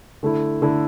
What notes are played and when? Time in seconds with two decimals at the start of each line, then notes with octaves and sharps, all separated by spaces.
0.23 D3 A3 E4
0.62 D3 A3 E4